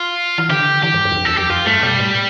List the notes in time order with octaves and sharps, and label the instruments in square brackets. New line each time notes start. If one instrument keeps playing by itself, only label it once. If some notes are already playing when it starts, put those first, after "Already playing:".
Already playing: [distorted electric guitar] F4
[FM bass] E3
[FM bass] D3 [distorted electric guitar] G4
[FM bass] E3 [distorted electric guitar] G4
[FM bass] G2
G2
E2
F2
[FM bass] E2 [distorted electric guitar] A4
[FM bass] F2 [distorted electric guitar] G4
[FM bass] F2 [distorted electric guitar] F4
[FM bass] G2 [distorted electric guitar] A3
[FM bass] B2 [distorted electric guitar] G3
[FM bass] A2